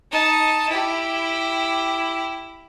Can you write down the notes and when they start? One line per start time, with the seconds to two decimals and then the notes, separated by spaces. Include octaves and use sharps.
0.12 D#4 A5
0.69 E4 G4